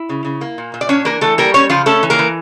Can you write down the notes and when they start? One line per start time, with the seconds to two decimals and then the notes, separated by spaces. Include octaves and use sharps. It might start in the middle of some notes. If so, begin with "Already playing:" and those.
Already playing: E4
0.09 C#3
0.25 C#3
0.41 A#3
0.58 A#2
0.74 A#2
0.81 D5
0.89 C#4 D4 C#5
1.05 E3 A#3 A#4
1.21 E3 A3 A4
1.38 G3 A#3 A#4
1.54 A#3 C#4 C#5
1.69 C#3 F3 F4
1.86 A3 C#4 A4
2.03 E3
2.10 A#3 A#4
2.19 E3